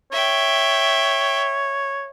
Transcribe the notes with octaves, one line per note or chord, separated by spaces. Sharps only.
C#5 E5 G5